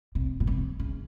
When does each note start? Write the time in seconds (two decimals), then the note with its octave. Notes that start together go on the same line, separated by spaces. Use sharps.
0.15 C3
0.40 B2
0.47 C3
0.80 C#3